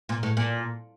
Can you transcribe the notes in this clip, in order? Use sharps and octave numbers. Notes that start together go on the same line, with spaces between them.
A#2
A2
A#2